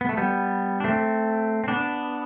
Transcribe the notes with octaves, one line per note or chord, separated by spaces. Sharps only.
B3
A3
G3 B3
D4
A3 C4
C4
B3 D4